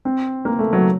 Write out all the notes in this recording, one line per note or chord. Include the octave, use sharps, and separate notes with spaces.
C4
A#3
A3
F#3